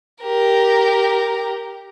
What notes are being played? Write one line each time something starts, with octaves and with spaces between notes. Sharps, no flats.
G4 A#4